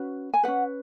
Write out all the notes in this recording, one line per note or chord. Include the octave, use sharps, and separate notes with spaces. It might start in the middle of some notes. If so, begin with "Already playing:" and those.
Already playing: C#4 F#4 B4
G#5
C#4 F#4 B4 F#5